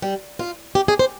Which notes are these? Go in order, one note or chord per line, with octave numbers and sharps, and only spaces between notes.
G3
F4
G4
G#4
C5